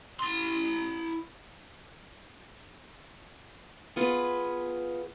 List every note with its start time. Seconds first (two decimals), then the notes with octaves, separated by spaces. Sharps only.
0.19 E4 C6
3.96 B3 F4 G#4 B4